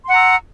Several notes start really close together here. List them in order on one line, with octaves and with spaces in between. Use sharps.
C6 F#5 A#5 E6